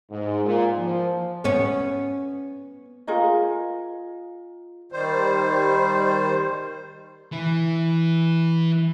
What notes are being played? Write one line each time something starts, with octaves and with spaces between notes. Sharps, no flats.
G#2
A#2
F3
B3 C#4
F4 G#4 A#4 D#5
D#3 G3 C5
E3 E4